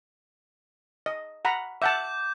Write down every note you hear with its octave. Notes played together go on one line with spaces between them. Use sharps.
D#5
F#5 A#5 B5
E5 F#5 A5 D6 G6